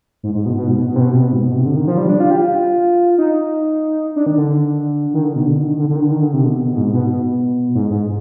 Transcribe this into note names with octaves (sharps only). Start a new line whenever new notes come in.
G#2
G#2
B2
B2
G#2
B2
B2
C3
B2
C3
B2
G#2
B2
C3
D3
D#3
F3
G3
D4
F4
G4
F4
D#4
D4
D#3
D3
D#3
D3
B2
D3
D#3
D3
D3
D#3
D3
D#3
D3
C3
B2
B2
G#2
B2
B2
G#2
G#2